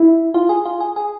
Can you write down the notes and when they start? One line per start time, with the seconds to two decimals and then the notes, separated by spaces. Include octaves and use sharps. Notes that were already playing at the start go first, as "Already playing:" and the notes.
Already playing: E4
0.34 F4
0.49 G#4
0.66 F4
0.81 G#4
0.96 G#4